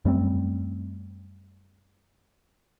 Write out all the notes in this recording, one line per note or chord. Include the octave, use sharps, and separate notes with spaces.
F#2 G3 A3 C4